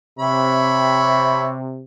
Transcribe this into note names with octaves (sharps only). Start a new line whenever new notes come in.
C3 C#5 E5 B5